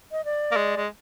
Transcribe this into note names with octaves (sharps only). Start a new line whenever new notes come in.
D#5
D5
A#3
G#3
G#3